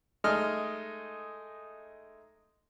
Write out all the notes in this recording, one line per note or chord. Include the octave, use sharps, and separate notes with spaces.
G#3 A3 D#4 F6